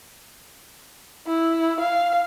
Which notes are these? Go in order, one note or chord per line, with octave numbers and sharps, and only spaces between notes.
E4
F5